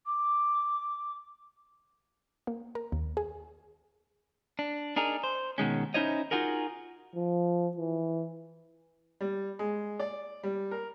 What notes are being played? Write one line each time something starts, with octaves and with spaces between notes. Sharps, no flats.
D6
A#3
A#4
D#2
G#4
D4
D4 D#4 G#4 A#4
C5
B2 D#3 G#3 C#4
C#4 D#4 E4 C5 C#5 D#5
D#4 F4 F#4 G#4 A#4
F3
E3
G3
G#3
D5
G3
A#4